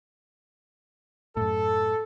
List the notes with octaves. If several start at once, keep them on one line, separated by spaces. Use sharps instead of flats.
F#2 A2 A4